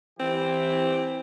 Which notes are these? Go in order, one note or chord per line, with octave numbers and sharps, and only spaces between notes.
E3 C4 G4